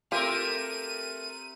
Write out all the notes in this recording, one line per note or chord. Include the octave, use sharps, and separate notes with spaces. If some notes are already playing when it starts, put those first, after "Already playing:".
A3 C4 F4 G4 A#4 D#7